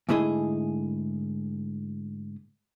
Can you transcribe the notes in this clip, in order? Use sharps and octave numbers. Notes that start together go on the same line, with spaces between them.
G#2 D3 A3 E4 G#4 D#5